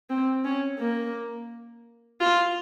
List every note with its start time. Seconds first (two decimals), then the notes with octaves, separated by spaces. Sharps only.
0.10 C4
0.45 C#4
0.79 A#3
2.20 F4